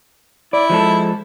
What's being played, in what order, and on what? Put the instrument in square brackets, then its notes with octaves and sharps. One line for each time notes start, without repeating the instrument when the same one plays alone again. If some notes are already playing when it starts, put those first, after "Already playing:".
[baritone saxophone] E4 [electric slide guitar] D5
[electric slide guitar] F3 G#3 A4